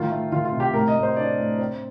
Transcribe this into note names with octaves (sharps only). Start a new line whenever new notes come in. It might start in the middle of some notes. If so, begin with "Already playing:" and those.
Already playing: A2 D#3 F4
A3
D#3 F4
F4
C3
G4
A2 A#4
D#5
A2
C5
D4 D5
A2
C4